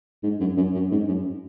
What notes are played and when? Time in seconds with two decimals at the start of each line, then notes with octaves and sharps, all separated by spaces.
0.23 G#2
0.40 F#2
0.57 F#2
0.74 F#2
0.92 G#2
1.08 F#2